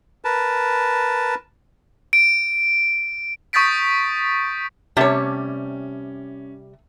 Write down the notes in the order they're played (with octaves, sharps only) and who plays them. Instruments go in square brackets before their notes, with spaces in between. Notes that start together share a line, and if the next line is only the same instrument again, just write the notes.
[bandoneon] A#4 B4 A5
[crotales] D7
C#6 D#6 G6 A6 B6 D7
[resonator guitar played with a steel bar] C3 G3 A5 [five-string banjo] A3 C#5 [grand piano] C#4